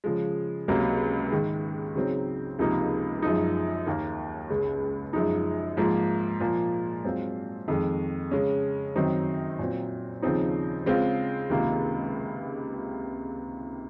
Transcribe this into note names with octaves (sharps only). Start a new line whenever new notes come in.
C#3 F3 G#3
C#2 C3 F#3 A#3
G#2 D#3 G#3
C#3 F#3 C4 D#4
C#2 C3 F3 A#3 D#4
F#2 F3 G#3 D#4
D#2 D#3 A#3
C#2 C#3 G#3
F#2 F3 G#3 D#4
G#2 F3 A#3
A#2 F3 A#3 F4
G#2 F#3 C4 F4
F2 D#3 G#3
C#3 G#3 C#4
F#2 D#3 F#3 C4 D#4
A#2 F#3 C4
D#2 C#3 F3 C4 D#4
C#3 G#3 C4 F4
C#2 C3 D#3 A#3 F4